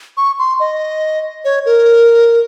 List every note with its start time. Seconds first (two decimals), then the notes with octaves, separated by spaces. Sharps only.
0.17 C#6
0.39 C6
0.60 D#5
1.45 C#5
1.66 A#4